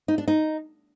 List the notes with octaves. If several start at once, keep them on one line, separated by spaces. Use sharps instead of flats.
D#4
D4
D#4